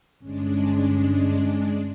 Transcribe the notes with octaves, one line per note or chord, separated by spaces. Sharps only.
G1 G#3 C#4 D4